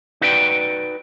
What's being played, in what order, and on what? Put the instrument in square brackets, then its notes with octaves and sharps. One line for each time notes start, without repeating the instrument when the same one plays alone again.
[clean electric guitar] D#4 F#4 B4 D5 G5